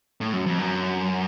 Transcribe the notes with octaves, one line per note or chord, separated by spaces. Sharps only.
A2
F#2
F2
F#2